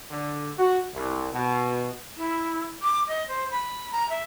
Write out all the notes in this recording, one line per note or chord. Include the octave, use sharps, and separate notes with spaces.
D3
F#4
C2
B2
E4
D6
D#5
C5
B5
A#5
E5